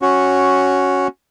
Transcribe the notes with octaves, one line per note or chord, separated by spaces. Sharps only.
C#4 F#4